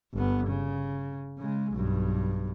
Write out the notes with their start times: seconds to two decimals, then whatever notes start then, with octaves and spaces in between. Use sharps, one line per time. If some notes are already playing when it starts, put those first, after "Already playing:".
0.14 G1 B3
0.47 C#3
1.38 C#3 G#3
1.72 B1 G2